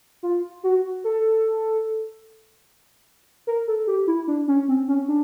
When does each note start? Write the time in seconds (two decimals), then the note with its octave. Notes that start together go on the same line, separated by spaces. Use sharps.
0.23 F4
0.64 F#4
1.04 A4
3.47 A#4
3.68 A4
3.87 G4
4.07 E4
4.27 D4
4.48 C#4
4.68 C4
4.88 C#4
5.08 D4